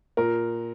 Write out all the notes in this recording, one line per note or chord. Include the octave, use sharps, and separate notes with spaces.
A#2 A#4